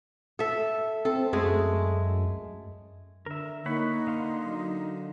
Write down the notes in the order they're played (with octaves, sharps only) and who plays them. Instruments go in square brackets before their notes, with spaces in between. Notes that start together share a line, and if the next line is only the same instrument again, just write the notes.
[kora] A4 E5
[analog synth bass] C4 [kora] A4
[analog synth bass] F#2 [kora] G#3 A3 G#4
[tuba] D3 [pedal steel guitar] A#4 E5
[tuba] A#3 [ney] D#4 [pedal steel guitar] C#5 F#5 B5
[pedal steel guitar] D3 F5 C6
[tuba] F#3